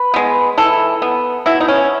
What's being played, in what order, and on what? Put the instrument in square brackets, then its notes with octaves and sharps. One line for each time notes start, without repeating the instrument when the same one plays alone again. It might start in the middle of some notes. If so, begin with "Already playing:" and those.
Already playing: [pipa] B4
G#3 B3
E3 A4
B3
B2 E4
D#4
C#4